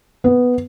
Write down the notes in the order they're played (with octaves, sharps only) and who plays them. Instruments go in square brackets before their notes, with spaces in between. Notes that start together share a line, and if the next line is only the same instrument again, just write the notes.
[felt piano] B3